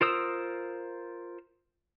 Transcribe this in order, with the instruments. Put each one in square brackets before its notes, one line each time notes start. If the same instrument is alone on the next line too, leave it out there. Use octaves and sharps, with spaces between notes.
[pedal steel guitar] F4 A#4 C5 D#6 E6